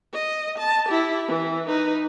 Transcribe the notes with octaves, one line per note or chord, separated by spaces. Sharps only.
D#5
A5
E4 G4
E3
D#4 B4